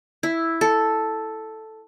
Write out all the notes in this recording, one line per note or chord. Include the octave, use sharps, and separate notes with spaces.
E4
A4